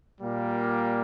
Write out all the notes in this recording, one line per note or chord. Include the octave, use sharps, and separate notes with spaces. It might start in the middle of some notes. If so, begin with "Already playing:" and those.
A#2 G3 A#3